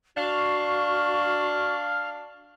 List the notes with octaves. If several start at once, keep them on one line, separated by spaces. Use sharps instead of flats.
D4 F#4 F5 C#6